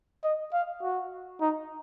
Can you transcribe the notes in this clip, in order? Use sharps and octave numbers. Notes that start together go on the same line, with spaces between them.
D#5
F5
F#4
D#4